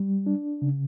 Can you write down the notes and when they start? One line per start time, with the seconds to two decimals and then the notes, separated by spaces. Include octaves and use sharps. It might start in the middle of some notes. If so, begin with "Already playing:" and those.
Already playing: G3
0.26 D4
0.62 C#3